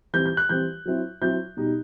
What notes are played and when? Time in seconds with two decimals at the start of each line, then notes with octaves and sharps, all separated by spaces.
0.13 E3 G3 C4 G6
0.25 G6
0.37 F#6
0.49 E3 G3 C4 G6
0.85 F#3 C4 E4
1.21 F#3 C4 E4 G6
1.57 B2 G3 D#4